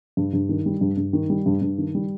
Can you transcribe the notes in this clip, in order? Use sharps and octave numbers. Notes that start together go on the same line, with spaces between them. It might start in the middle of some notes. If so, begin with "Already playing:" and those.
G2
G2
D#3
G3
G2
G2
D#3
G3
G2
G2
D#3
G3